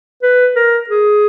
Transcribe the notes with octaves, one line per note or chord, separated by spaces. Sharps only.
B4
A#4
G#4